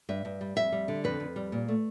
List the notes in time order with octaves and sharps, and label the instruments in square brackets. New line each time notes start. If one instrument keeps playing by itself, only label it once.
[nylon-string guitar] G2 E5
G2
G3
F2 E5
G3
D3
F2 B4
F2
G3
A#2
A3